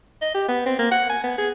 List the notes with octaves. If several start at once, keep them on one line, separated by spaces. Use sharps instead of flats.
D#5
G4
B3
C4
A#3
F#5
G#5
B3
G#4